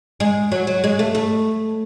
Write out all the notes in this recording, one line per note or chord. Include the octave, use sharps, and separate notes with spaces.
G#3
F#3
F#3
G#3
A3
A3